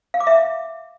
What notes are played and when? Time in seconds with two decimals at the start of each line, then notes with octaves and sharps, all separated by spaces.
0.14 F5
0.20 D6
0.27 E5